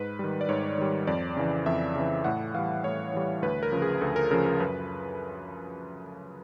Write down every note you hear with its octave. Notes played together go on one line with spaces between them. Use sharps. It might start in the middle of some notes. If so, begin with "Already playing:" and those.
Already playing: G#2 B4
D#3 G3
D5
G#2 C#5
D#3 G3
F2 D5
C#3 E3
F2 E5
C#3 E3
A2 F#5
E3 G3 F5
A2 C#5
E3 G3
D2 B4
A#4
C#3 F3
G#4
D2 A4
A#4
C#3 F3 A#4
A#4
F#2 B4